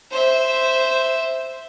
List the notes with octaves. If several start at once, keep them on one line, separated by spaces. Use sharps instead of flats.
C5 E5